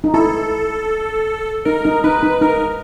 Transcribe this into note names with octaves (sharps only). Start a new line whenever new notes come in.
D#4
E4 A4
D#4 A#4
D#4
D#4 B4
D#4
D#4 A#4